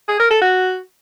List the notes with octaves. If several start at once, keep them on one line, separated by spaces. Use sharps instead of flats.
G#4
A#4
A4
F#4